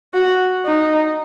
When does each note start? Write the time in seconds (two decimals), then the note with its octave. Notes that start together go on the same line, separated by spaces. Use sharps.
0.14 F#4
0.66 D#4